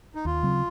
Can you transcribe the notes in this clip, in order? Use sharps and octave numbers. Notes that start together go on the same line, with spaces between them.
D#4
D#2 F4
C#3 F#3 C4